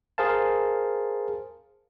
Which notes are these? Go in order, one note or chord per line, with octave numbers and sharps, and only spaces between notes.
G#4 A#4 C5 F5 A5